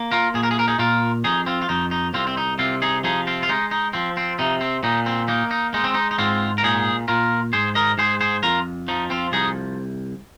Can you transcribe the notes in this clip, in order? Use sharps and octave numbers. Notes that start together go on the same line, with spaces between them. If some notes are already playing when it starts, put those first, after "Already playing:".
Already playing: A#3
F4 A#4
A#2 G#4
A#4
G#4
A#4
D#4 G#4
A#2 F4 A#4
F2 D#4 G#4
C4 F4
F4
F2 D#4
D#4
C2 C4 F4
C4
D#4
C3 C4 F4
D#4 G#4
F3 D#4 G#4
C4 F4
F4
G#3 D#4
D#4
F3 C4
C4
C3 D#4
C4
A#2 D#4
C4
A#3 D#4
D#4
G#3 D#4
C4
D#4
D#4
G#2 C4 F4
A#4
A#2 D#4 G#4
A#2 F4 A#4
G#2 G#4 C5
A#4 D#5
G#2 G#4 C5
G#4 C5
F2 F4 A#4
F3 D#4
C4 F4
C2 D#4 G#4